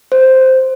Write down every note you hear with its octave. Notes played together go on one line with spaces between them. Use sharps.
C5